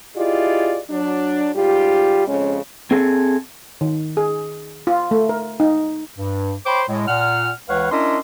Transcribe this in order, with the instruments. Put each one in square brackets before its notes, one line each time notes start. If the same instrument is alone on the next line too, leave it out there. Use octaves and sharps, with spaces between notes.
[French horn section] E4 F4 G4 G#4 D5 D#5
F#3 D4
G#2 G3 F4 G4
F2 C#3 G#3 C#4
[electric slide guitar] C4 G#4 A4
[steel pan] D#3
G#4
F4
A3
A#4
D#4
[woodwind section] G2
C5 C#5 G5 B5 C6 D6
A2 G#3
A#2 F#5 F6
C#2 E3 B4 C#5 F5 F#5
C#4 D4 E4 A#4 D#5 C6